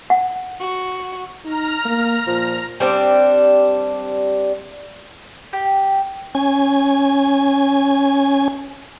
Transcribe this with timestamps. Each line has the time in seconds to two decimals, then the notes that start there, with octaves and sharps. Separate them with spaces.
0.10 F#5
0.60 F#4
1.45 D#4 A#5 F6
1.85 A#3
2.27 A#2 F3
2.80 G3 C4 D4
5.53 G4
6.35 C#4 G#5